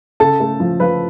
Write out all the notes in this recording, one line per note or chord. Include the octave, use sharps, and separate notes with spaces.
C#3 A4 A5
A3
F3
F3 B4